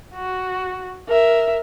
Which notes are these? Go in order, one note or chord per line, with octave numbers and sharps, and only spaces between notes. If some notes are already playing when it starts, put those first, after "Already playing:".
F#4
A#4 E5